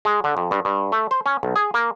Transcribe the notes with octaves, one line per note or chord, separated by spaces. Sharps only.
G#3
D3
F2
G2
G2
A3
C5
C#4
B1
G#4
A#3